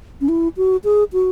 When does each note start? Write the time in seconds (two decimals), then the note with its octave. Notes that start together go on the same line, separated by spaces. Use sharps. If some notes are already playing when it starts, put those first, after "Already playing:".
0.21 C#4
0.29 E4
0.57 F#4
0.84 G#4
1.13 F#4